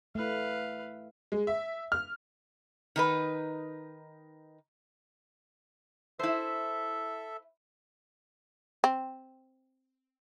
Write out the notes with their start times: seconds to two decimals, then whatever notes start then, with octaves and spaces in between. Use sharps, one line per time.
0.15 A3 E4 B4 F5
1.32 G#3
1.47 E5
1.92 F6
2.96 D#3 D#4 B4
6.19 E4 A4 C5 E5
8.84 C4